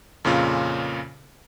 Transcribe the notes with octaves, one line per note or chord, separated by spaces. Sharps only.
F2 A#2 C#3 C#4 F4